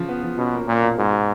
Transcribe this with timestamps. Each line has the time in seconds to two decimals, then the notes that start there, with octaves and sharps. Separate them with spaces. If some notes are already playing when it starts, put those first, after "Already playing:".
Already playing: C#3 F3
0.09 B3
0.23 F3
0.38 B2 C#4
0.53 A#3
0.68 A#2 A#3
0.82 B2
0.98 G#2 F#4
1.12 F#4